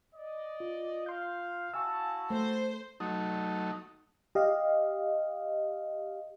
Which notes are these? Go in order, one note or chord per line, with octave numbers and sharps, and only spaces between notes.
D5 D#5
F4
F5 C6 G6
E4 F#4 F5 G#5 A5 C#6 E6
A3 C5
F#3 A3 D#4
G4 D#5 F5